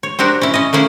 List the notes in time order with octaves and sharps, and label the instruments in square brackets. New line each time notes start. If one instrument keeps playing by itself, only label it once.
[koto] C#5
C4 D4 F#4 G4 A#4
C#4 E4
C#4 D#5
A3 A#3 C#4 E4 G#4